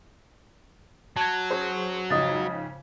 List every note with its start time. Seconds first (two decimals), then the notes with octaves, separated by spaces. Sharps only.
1.16 F#3 A5 G#6
1.51 C#4 G#4 C5
2.10 F2 G#2 C#3 D#5 D#6 A6